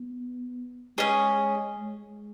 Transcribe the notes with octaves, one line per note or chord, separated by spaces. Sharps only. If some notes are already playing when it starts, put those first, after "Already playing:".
Already playing: B3
G#3 C#4 G#4 D#5
G#3